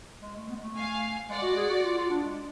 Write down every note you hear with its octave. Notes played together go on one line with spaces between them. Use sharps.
G#3
A3
B3
G#3
A3
F5 G#5
G#3 D5 F#5
F#4
G#4
F#4
F4
F4
D4
G#3